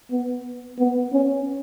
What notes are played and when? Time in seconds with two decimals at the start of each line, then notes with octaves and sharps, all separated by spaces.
0.11 B3
0.78 B3
1.12 C#4